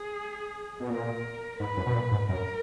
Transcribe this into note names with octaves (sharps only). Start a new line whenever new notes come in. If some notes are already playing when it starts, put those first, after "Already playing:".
Already playing: G#4
B2
A#2 A#4
G#2 B4
F#2
B2
A#2
G#2
F#2 A#4